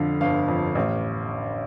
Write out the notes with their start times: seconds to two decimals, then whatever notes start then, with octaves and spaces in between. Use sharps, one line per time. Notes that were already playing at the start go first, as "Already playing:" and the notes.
Already playing: F2 D3 F5
0.21 G1 F5
0.48 F2
0.75 A1